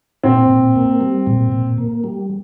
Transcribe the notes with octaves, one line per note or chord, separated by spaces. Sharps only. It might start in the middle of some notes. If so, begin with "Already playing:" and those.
A#2 C4
A#2
A#3
G3
A#2
A#2
A#3
G3